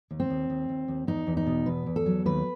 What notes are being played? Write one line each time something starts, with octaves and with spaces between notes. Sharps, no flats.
D#2
C4
D#2
D#2
D#2
D#2
E2 D#4
E2
D#4
B2
E2 B4
E2
A4
F#3
D#2 B4